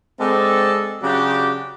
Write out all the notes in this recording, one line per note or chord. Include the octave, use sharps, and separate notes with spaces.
G#3 C4 D4 A4
C#3 F#3 D4 F#4 G4